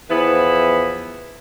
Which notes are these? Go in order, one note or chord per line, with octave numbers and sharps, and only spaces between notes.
E2 F3 B3 E4 B4